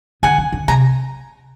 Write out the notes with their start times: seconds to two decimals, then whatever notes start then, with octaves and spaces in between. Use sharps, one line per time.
0.23 D3 F#5 G#5
0.38 D#3
0.52 D3
0.68 C3 G#5 A#5